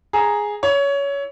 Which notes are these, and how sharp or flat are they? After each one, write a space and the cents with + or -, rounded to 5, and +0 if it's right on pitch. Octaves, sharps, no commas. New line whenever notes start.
G#4 +0 A#5 +0
E4 +0 C#5 +20